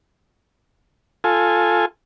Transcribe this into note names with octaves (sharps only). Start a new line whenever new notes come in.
F4 A4 G#5